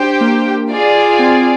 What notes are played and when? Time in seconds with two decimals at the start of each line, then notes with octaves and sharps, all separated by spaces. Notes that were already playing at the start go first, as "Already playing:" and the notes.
Already playing: D4 G4 C5 G5
0.21 A#3
0.70 F4 G#4 D5
1.19 C4